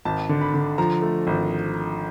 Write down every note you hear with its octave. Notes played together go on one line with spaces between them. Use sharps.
G#1 A5
D3
B5
D3
F3 A#5
A3
G#1